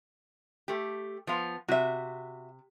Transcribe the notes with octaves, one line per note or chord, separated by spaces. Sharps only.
A3 G4
F3 B3 F5
C3 F#4 E5